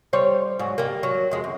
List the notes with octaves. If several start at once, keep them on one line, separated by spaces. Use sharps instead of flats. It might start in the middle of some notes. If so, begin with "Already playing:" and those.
G3 C5 C#5
G#2 F#3
G3 A#3
F#3
F2 G#3
F#2